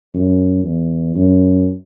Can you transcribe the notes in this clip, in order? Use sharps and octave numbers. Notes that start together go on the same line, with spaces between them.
F#2
E2
F#2